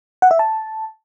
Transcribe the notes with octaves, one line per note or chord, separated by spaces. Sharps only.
F#5
E5
A5